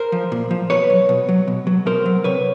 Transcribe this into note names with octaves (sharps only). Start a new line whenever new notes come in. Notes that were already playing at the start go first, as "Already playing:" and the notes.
Already playing: A#4 C5
F3
A#2
F3
B2 B4 C#5
F#3
B2
F#3
B2
F#3
B2 A#4 C5
F#3
C3 B4 C#5